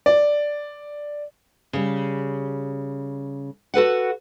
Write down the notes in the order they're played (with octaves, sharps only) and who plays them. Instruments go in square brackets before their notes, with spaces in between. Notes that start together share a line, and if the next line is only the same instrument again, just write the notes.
[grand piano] D5
[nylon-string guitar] C#3 G3
F#4 A4 B4 F#5